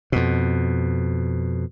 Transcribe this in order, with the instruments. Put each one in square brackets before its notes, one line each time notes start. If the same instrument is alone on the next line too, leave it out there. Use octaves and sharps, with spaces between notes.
[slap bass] F2 B2